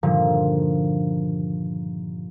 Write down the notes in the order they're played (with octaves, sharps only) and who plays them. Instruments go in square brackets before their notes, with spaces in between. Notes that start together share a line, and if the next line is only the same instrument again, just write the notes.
[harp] G2 A#2 D3 D#3 F3